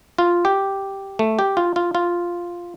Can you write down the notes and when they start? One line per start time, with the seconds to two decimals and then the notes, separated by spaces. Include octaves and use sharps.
0.18 F4
0.45 G4
1.19 A3
1.39 G4
1.57 F4
1.76 F4
1.95 F4